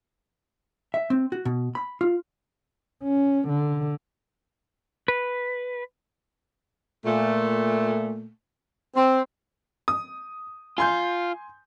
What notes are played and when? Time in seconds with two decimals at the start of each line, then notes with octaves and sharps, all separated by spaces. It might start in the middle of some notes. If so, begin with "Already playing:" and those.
0.94 E5
1.10 C4
1.32 F#4
1.45 B2
1.75 B5
2.01 F4
3.04 C#4
3.49 D3
5.08 B4
7.05 A#2 A3
8.95 C4
9.88 D#6
10.78 F4 G#5 C6 G6